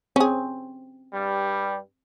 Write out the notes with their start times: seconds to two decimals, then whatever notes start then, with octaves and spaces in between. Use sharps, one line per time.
0.16 C4 C#4 G#4
1.14 G2 G3